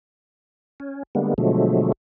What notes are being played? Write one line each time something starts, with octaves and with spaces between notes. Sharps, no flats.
C#4
D3 G3 G#3 A#3 B3
B2 D3 F3 F#3 G#3 A3